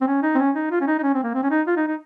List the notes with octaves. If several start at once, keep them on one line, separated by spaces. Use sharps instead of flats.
C4
C#4
D#4
C4
C#4
D#4
F4
C#4
D#4
D#4
C#4
C4
A#3
C4
C#4
D#4
F4
D#4
D#4